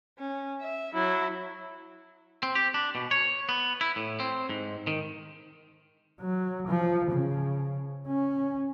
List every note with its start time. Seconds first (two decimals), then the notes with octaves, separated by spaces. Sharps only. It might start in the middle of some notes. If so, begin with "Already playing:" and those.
0.18 C#4
0.61 E5
0.94 F#3 E4
2.43 C4
2.55 G4
2.74 D4
2.95 B2
3.11 C#5
3.49 B3
3.81 E4
3.96 A2
4.20 C4
4.49 G#2
4.87 D#3
6.21 F#3
6.68 F3
7.11 C#3
8.07 C#4